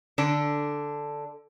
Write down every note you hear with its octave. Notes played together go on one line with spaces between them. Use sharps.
D3 D4